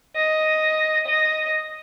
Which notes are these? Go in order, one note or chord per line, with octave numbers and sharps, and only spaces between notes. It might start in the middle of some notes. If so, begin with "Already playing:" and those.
D#5
D#5